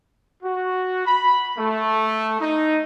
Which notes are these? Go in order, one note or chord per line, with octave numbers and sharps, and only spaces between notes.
F#4
B5
A3
D#4